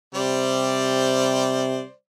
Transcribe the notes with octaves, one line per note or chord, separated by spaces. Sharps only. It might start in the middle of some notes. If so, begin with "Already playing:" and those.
C3 G3 C5 D5